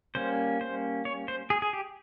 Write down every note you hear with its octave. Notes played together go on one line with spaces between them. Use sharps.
G3 A#3 C#4 C5
C5
C#5
C5
G#4
G#4
G4